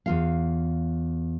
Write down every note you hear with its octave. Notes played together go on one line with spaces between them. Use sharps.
E2 F4 F5